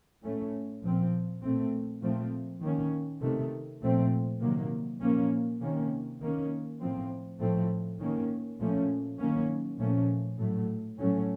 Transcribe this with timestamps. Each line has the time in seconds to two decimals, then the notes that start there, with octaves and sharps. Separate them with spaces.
0.22 A2 A3 C#4
0.83 A#2 F3 C4
1.42 A#2 A3 C4
2.02 A#2 F3 A3 C4
2.61 D#3 A#3 C#4
3.21 C3 D#3 A3
3.81 A#2 F3 A3 C4
4.41 C3 D#3 F#3 A#3
5.01 A#2 F3 A#3 C#4
5.61 C3 D#3 A#3 C#4
6.20 D#3 A#3 C#4
6.81 A2 F3 C4
7.40 A2 F3 A3 C4
7.99 D#3 A#3 C#4
8.59 A#2 F3 A3 C#4
9.19 D#3 F#3 A#3 C#4
9.79 A#2 F3 A3 C#4
10.38 A2 F#3 A3
10.98 A2 F#3 A3 C#4